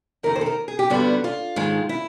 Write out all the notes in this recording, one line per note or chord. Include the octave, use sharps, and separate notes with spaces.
F2 C3 D#3 A#4
C5
A4
A#4
G#4
G4
G2 D3 G3 B3 F#4
F4
G#2 D#3 G#3
E4